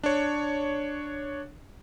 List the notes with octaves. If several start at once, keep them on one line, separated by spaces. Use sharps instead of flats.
D4 C#5